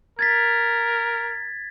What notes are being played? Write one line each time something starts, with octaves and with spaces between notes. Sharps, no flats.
A#4 G#6 A6 B6